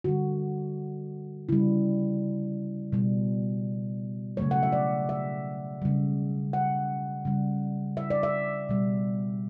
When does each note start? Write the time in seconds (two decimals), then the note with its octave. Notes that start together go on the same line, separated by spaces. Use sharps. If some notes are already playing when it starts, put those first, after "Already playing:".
0.04 D3 G3 F#4
1.49 C#3 G3 E4
2.92 B2 G3
4.37 C#3 F#3 A3 C#5
4.51 F#5
4.63 E5
4.72 D5
5.09 E5
5.82 C#3 G3
6.53 F#5
7.25 C#3 G3
7.97 E5
8.10 D5
8.23 E5
8.69 B2 G3